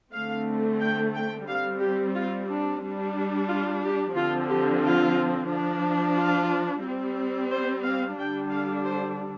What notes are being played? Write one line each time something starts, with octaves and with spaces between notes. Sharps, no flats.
D3 A3 C4 F5
G5
G5
G3 C4 F5
G4
F4
D4
G3 D4
F4
G4
D3 F3 C4 F4
G4
F4
F3 D4
F4
G3 C4
C5
F5
D3 G3 D4 G5
F5
C5